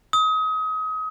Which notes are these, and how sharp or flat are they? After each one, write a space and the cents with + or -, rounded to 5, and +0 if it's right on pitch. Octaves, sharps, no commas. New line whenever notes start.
D#6 +30